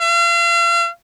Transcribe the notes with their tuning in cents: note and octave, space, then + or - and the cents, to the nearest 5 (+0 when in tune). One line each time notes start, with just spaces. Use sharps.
F5 -40